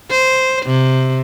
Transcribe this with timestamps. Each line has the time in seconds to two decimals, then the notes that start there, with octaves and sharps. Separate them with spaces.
0.11 C5
0.66 C3